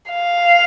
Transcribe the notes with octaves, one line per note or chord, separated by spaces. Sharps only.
F5